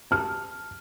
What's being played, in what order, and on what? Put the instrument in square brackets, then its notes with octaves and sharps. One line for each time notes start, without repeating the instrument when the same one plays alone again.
[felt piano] A5 F6